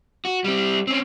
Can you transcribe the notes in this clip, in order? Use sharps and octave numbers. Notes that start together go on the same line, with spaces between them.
F#4
G3 C4
C4 C#4